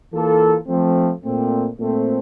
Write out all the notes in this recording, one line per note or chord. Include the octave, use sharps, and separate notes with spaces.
E3 A#3 F4 A4
F3 A3 C4
A#2 A3 C4
A#2 A3 C4